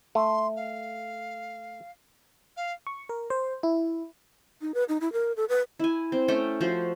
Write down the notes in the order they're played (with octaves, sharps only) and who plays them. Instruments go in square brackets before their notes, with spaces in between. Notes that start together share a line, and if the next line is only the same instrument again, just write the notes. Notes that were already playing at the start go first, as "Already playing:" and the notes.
[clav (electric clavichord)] A3 [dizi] C6
[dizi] F5
F5
[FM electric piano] C#6
A#4
C5
E4
[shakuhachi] D#4
B4
D#4
E4
A#4
A4
B4
[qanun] E4 G#5
C4
A3 C#4 G5
F3 F#4 C5